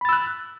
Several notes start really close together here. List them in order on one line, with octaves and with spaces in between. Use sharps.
B5 A6 E6 F#6